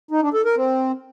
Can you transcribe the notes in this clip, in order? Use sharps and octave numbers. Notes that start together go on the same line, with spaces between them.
D#4
D4
A4
A#4
C4